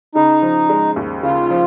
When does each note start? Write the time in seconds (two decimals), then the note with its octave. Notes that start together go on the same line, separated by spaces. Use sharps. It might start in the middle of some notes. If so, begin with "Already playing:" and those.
0.15 C#3 D#4
0.42 F3
0.69 G#3
0.96 D#2
1.23 C#3 F4
1.51 F3